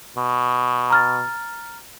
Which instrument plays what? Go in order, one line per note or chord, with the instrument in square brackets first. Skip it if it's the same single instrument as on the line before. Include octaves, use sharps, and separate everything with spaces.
[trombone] B2
[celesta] A#5 F6 A6